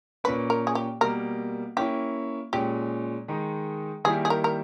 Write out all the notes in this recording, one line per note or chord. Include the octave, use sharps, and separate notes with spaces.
A#2 A#3 C#4 B4
A#4
G#4
G4
B2 G3 A#3 A#4
A#3 C#4 E4 G4
A#2 G#3 C#4 G4
D#3 G#3 D#4 G#4
D#3 G3 A#3 E4 G#4
G#4
A#4
A#4